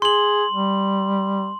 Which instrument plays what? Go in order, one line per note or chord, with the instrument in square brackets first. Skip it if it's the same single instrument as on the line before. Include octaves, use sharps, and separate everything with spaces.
[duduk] G#4 [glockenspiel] C6 F#7
[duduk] G3